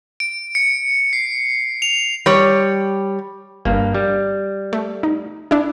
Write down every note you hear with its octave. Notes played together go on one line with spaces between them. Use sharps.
D7
C#7
C7
F7
G3 C#5
G1 G2 A#3
G3
A3
D#4
D4 E4